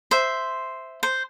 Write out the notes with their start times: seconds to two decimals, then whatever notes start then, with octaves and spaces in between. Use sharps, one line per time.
0.11 C5 E5
1.03 C5